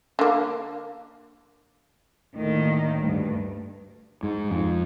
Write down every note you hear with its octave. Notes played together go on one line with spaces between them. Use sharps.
D3 A#3
D2 A2 D#3 A#3
D2 G2
G#2
F2